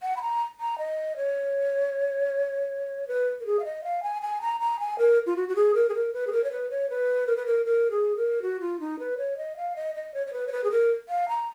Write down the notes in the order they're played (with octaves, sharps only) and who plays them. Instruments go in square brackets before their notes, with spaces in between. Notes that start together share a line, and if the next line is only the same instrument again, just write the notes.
[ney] F#5
B5
A#5
A#5
D#5
C#5
B4
A#4
G#4
F5
D#5
F5
G#5
G#5
A#5
A#5
G#5
A#4
F4
F#4
F#4
G#4
A#4
G#4
A#4
B4
G#4
A#4
C#5
B4
C#5
B4
A#4
B4
A#4
A#4
G#4
A#4
F#4
F4
D#4
B4
C#5
D#5
F5
D#5
D#5
C#5
C#5
B4
C#5
B4
G#4
A#4
F5
A#5